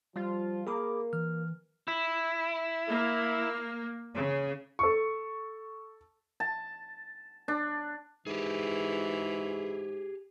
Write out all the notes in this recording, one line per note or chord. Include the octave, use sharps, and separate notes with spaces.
F3 G3 F4
A#3 G#4 A#4 B5 D6
E3 F6
E4
A#3
C#3
A4 C#6
A5
D4
G#2 E3 G4 G#4